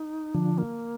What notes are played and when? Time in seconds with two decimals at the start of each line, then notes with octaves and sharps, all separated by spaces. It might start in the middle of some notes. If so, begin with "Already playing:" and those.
Already playing: D#4
0.34 D3 F3 D4
0.58 A#3